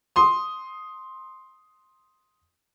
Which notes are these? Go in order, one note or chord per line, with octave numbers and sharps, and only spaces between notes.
C6 D#6